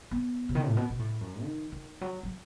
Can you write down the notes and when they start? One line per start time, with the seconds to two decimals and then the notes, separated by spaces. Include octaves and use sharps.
0.11 B3
0.49 C3
0.55 D#3
0.68 A2
0.77 B2
0.90 B2
0.99 A2
1.21 F#2
1.43 D#3
1.72 D#3
2.01 F#3
2.23 F#3